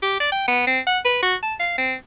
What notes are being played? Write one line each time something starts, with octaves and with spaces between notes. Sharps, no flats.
G4
D5
G5
B3
C4
F#5
B4
F#4
A5
F5
C4